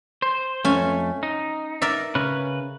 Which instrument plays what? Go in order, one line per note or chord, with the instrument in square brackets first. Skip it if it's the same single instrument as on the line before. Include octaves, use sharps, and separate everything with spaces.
[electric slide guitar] C5
[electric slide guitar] F2 A3 [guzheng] C#4 G#5
[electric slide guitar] D#4
[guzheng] A#4 D5 E5
[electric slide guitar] C#3 C#4 B4